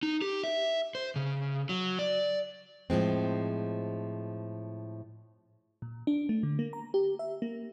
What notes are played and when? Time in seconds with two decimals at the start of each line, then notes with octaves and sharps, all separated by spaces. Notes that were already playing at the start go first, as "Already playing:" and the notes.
0.03 D#4
0.22 G4
0.44 E5
0.95 C5
1.16 C#3
1.69 F#3
1.99 D5
2.90 A2 F3 G#3 C4
5.82 A#2
6.07 D4
6.29 A3
6.43 D3
6.59 A#3
6.73 A#5
6.94 G4
7.19 E5
7.42 A#3